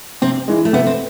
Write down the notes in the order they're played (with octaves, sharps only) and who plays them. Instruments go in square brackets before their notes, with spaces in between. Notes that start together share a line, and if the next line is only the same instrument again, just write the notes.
[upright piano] C3 [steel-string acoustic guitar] C4
[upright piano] E3 G#3
[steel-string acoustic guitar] A3
[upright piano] C3 [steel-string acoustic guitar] B3
[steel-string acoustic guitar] C4